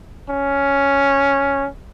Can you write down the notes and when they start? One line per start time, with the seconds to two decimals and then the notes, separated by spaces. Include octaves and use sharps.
0.30 C#4